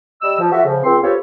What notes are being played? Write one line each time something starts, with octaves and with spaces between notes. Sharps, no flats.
G3 D5 D#5 E6
F3
F4 F#4 A4 E5
C#3 F3
C#2 C4 C6
B3 F4 G4 A4 C5 C#5